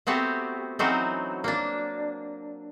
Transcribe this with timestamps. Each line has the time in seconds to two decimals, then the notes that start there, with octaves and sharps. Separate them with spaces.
0.07 A3 B3 C4 F#4 G4
0.79 E3 F#3 C4 C#4 D#4 F#4
1.44 A#3 D4